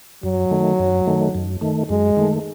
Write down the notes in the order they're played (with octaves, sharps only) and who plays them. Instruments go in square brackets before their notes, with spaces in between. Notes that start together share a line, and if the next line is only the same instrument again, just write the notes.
[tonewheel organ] F#2 [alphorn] F#3
[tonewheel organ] D#3 A3
F#2
D#3 A3
F#2
D#3 A3
[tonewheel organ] F#2 [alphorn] G#3
[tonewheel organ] D#3 A3